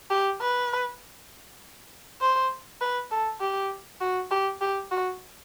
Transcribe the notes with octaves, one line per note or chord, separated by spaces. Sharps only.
G4
B4
C5
B4
A4
G4
F#4
G4
G4
F#4